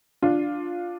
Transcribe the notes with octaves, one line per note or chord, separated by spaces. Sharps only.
D4 F4